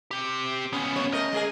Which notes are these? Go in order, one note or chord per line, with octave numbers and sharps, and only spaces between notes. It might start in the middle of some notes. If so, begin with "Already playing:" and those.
C4 G4
C#2 B3 C#4
F#2 C#5
A3 A#4 D#5
G#3 G#4 A#4